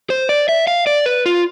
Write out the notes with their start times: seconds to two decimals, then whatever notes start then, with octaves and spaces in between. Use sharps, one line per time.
0.10 C5
0.29 D5
0.49 E5
0.67 F5
0.87 D5
1.06 B4
1.26 F4